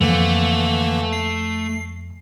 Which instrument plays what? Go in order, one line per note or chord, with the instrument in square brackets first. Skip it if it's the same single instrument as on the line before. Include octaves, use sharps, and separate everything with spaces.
[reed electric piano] F2 [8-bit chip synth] D3 E3 A#3 [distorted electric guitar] A3
[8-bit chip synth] C7